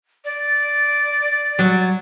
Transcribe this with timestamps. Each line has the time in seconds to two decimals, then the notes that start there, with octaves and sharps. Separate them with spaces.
0.25 D5
1.59 F#3